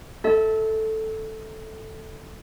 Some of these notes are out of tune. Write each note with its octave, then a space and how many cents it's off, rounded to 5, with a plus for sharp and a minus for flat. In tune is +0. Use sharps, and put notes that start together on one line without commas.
A4 +0 E5 -30